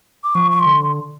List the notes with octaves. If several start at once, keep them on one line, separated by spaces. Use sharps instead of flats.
D6
F3 C#6
C#6
C6
D3